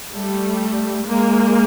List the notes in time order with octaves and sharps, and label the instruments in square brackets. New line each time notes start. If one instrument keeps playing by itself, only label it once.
[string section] G3 A3
G#3 A#3